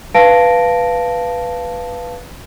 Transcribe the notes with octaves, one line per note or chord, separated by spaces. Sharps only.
B4 F5 A5 A#6 D7